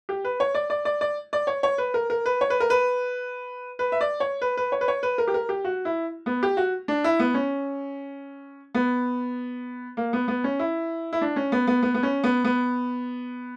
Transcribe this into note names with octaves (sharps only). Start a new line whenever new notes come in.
G4
B4
C#5
D5
D5
D5
D5
D5
C#5
C#5
B4
A#4
A#4
B4
C#5
B4
A#4
B4
B4
E5
D5
C#5
B4
B4
C#5
B4
C#5
B4
A#4
G4
A#4
G4
F#4
E4
B3
G4
F#4
D4
E4
B3
C#4
B3
A#3
B3
B3
C#4
E4
E4
D4
C#4
B3
B3
B3
B3
C#4
B3
B3